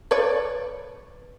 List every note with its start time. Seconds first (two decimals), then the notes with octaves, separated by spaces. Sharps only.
0.11 B4 C#5 D5